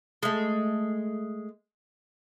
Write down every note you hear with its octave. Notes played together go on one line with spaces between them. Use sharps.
G#3 A3